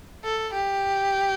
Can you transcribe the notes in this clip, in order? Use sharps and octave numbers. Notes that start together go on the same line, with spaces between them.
A4
G4